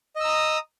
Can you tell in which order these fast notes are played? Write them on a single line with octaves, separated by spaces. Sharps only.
D#5 E6 A#5 D#6